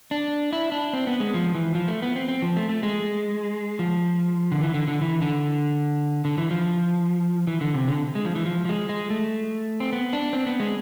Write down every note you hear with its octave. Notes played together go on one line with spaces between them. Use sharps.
D4
E4
D4
C4
B3
G#3
F3
E3
F3
A3
B3
C4
C4
F3
A3
A3
G#3
F3
D3
E3
D3
D3
E3
D3
D3
E3
F3
E3
D3
C3
D3
G#3
F3
E3
F3
F3
G#3
G#3
A3
C4
B3
D4
C4
B3
G#3